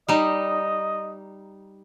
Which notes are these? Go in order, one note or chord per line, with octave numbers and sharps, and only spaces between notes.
G3 D#4 D#5